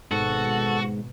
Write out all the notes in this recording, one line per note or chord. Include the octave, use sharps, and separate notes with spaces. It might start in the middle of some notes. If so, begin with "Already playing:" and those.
G#1 G#2 B2 F#4 A4